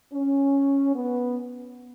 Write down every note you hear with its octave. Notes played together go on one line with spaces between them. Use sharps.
C#4
B3